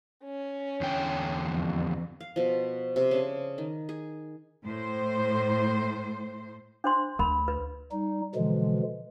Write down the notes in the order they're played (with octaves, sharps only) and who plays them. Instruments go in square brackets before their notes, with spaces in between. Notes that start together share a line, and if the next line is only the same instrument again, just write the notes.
[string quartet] C#4
[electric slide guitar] E2 D3 G5
[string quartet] F2
[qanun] F5
B2 F3
C3
C#3 D4
D#3
G#4
[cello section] A2 C5
[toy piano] D4 C5 C6
[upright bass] D2 [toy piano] A#4 B5
[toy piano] B4
[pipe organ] G3 D#4
B2 D3 E3 F3 G#3